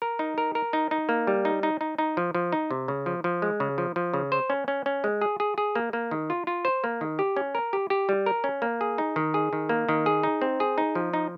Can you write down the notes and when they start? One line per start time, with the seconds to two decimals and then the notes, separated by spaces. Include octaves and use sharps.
0.02 A#4
0.19 D#4
0.38 A#4
0.55 A#4
0.73 D#4
0.91 D#4
1.09 A#3
1.27 G3
1.45 D#4
1.63 D#4
1.81 D#4
1.98 D#4
2.17 F3
2.35 F3
2.52 D#4
2.71 C3
2.88 C#3
3.06 F3
3.24 F3
3.42 G#3
3.60 C#3
3.78 F3
3.96 F3
4.14 C#3
4.32 C5
4.50 C#4
4.68 C#4
4.86 C#4
5.04 G#3
5.22 G#4
5.40 G#4
5.58 G#4
5.75 A#3
5.93 A#3
6.11 D#3
6.30 F4
6.47 F4
6.65 C5
6.84 A#3
7.01 D#3
7.19 G4
7.36 C#4
7.55 A#4
7.73 G4
7.90 G4
8.09 G3
8.26 A#4
8.44 C#4
8.62 A#3
8.81 G#4
8.98 D#4
9.16 D#3
9.34 G#4
9.53 D#3
9.69 A#3
9.89 D#3
10.06 G#4
10.23 D#4
10.42 C4
10.60 G#4
10.78 D#4
10.95 F3
11.13 D#4